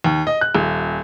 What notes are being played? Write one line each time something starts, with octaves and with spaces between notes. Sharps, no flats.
D#2
D#5
F#6
D#1